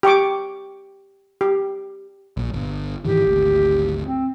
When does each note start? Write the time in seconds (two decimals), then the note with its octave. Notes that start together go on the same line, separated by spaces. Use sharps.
0.03 G4 G5 C#6 D6
1.41 G4
2.37 A#1
2.53 G1
3.05 G#2 D#3 E3 G4
3.25 G#1 D2
4.04 C4